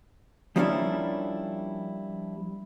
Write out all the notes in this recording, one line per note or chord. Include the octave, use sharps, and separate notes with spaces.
F3 G3 A#3 C#4 D4 E4